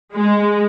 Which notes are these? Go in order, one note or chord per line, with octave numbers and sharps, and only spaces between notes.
G#3